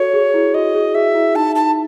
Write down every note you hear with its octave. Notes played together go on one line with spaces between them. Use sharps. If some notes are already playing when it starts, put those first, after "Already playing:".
Already playing: F#4 A4 C#5
G#4
E4
F#4 D#5
G#4
G#4 E5
E4
D#4 A5
A5